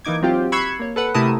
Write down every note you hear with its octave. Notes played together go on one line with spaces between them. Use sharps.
E3 A#3 D#4 D6 G#6
F#3 C4 F4 G4
B5 C#6 E6 F#6 G#6 C7
A#3 C#5
A4 B4 F#5
C3 A3 E4 A#4 A5 D#6